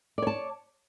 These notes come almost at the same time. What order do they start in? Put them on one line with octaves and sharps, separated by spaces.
D5 C#5 A5